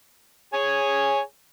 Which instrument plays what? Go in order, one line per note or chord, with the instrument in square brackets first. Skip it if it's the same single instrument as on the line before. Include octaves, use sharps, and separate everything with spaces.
[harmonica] G#4 C#5 G#5